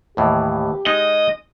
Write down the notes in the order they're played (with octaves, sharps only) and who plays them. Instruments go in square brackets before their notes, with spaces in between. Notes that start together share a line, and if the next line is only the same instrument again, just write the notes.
[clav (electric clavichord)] D#2 A2 E3 [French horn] G4
[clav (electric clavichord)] G#3 D#4 [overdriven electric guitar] D#5